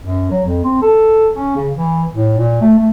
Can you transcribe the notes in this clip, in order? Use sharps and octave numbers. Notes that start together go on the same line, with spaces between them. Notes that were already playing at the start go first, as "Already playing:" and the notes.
F#2
F#3
F2
C4
A4
C#4
C#3
E3
A2
A#2
A3
A3